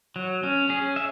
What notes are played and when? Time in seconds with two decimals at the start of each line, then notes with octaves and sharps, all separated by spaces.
0.16 F#3
0.43 C#4
0.69 C#4 G#4
0.96 E5